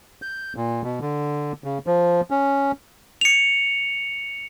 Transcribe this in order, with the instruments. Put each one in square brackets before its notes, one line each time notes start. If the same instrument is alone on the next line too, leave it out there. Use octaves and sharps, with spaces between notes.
[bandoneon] G6
A#2
B2
D3
C#3
F3
C#4
[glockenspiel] C#7 F7